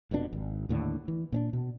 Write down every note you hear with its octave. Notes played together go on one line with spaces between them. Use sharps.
F1 F2 B2 D4
G#1
D#2 A2 D3 D4
E3
A#2 C#4 D4
B2